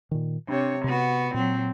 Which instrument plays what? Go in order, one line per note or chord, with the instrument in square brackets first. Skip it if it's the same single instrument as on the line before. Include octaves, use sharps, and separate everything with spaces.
[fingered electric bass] A#2 D#3
[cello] C3 C#5 [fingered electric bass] D4
[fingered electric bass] C3 [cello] B3 F#4
[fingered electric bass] A#2 [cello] F#3 C4